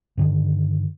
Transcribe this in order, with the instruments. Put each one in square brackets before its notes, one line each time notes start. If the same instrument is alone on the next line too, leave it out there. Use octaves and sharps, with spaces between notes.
[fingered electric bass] G2 D3 D#3